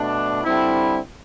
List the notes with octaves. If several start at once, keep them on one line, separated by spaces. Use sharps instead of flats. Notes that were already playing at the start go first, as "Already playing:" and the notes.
Already playing: B2 A3 D4
D3 G3 C4 E4